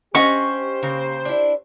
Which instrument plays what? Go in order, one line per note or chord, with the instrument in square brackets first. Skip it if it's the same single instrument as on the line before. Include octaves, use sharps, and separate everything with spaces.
[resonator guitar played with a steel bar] C#4 D#5 F#5 [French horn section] G4 C5 [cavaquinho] C#6
[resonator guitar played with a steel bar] C#3 [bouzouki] A#3
[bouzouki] D4 E4